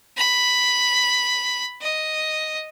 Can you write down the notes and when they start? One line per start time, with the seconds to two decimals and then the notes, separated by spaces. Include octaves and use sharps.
0.17 B5
1.81 D#5